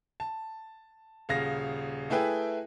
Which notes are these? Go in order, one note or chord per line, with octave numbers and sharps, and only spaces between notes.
A5
D#1 C#3 F5 A#6
A3 E4 G#4 B4 G5